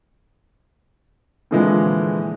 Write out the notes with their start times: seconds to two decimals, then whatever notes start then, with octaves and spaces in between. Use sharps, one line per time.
1.51 A#2 D3 E3 F3 G#3